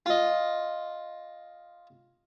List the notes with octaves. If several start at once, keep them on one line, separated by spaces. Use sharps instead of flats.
F4 D#5